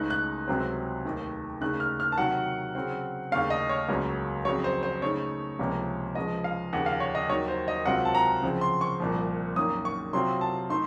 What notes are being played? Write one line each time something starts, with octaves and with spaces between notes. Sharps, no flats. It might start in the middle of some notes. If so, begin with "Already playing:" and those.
Already playing: C#2 C#3 A3 D#4 F#6
F#6
C#2 C3 F#3 C4
D#2 D#3 A3 D#4
D#2 C#3 A3 D#4 F#6
F6
F6
A5
C3 D#3 F#3 F#5
C#3 F#3 C4
D#2 C#3 A3 C#4 F5
D#5
C#5
C#2 C#3 F#3 A#3 C#4
F2 C#3 F#3 C#5
C5
C5
C#3 A3 D#4 C#5
C#2 C3 F3 A#3 C#4
C#2 C#3 F3 D#5
F5
D#2 C#3 F3 F#5
F5
C#5
D#5
D#2 D#3 F#3 C#5
C5
D#5
C#2 C3 F#3 C4 F4 F#5
A5
A#5
C#3 F3 C4
C6
C#6
C2 A#2 F3
F#2 D#3 A#3 C#4 D#6
C#6
C3 F#3 C4 F4 C6
A5
A3 D#4 C6